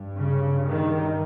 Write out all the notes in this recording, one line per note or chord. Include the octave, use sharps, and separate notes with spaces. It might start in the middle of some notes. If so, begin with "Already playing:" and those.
Already playing: G2
C#3
D#3